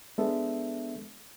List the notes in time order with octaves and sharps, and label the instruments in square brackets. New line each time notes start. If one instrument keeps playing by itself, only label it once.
[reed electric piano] G#3 B3 D4 A4 E5